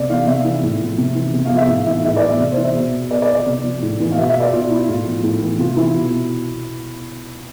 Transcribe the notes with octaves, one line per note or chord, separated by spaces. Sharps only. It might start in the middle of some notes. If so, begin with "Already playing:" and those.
Already playing: C3 D5
E3 F5
C3 E5
E3
A2
F3
C3
E3
C3
F5
F3
E5
A2
E3 E5
A2 E5
D5
E3
E5
C3
C5
E3
E5
B2
B2 D5
D5
D5
C3
F3
A2
E3
F5
B2 E5
E5
D5
B2 F4
E4
A2 F4
F3
A2
E3
C3 F4
E3 E4
B2